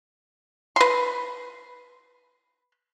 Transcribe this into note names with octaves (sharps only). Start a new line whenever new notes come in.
B4 C6